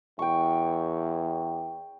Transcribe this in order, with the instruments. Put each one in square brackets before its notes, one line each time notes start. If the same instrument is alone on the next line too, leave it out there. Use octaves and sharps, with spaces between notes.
[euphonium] E2 [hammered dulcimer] G5 C#6